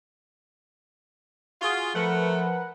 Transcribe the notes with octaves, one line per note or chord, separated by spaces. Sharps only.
F4 F#4 G#4
F3 A3 A#4 B4 F#5